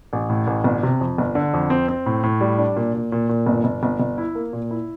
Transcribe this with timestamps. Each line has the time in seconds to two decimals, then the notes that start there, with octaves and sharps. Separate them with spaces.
0.13 A1
0.29 A2
0.47 A1
0.64 G1
0.83 C3
1.01 F2
1.18 G1
1.35 D3
1.54 F2
1.70 C4
1.88 C4
2.06 A2
2.23 A2
2.41 G3
2.58 D4
2.76 A#2
2.94 A#2
3.12 A#2
3.29 A#2
3.47 G1
3.64 G1
3.83 G1
4.00 G1
4.18 E4
4.35 A#3
4.53 A#2
4.71 E4